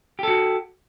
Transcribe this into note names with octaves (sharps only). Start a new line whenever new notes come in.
F#4 G4 A4